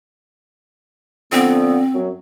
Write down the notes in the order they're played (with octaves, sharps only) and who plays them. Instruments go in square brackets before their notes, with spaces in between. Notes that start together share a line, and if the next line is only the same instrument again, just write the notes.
[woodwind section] D3 F3 B3 [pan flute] C4
[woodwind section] F#2 F#3